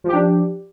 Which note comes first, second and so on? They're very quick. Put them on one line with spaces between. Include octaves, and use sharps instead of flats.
F3 G4 D4